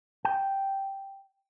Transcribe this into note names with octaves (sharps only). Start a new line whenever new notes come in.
G5